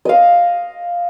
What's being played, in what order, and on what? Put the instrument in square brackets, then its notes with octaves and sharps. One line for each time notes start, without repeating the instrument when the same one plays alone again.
[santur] D#5 F5